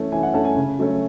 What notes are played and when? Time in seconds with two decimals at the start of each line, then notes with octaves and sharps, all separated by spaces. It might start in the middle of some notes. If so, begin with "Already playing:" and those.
Already playing: E3 A3 C#4
0.12 E3 G#5
0.23 F#5
0.34 A3 C#4 A5
0.44 G#5
0.56 C#3
0.78 F#3 A3 C#4